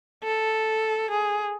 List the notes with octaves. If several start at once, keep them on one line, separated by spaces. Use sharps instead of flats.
A4
G#4